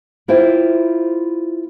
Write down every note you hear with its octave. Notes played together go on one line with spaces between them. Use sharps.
A#3 E4 F4 C5 E5 G5